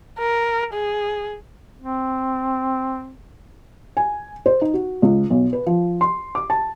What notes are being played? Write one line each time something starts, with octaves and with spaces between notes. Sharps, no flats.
A#4
G#4
C4
G#5
C5
D#4
F#4
C#2
B1
B4
F3
C6
D6
A5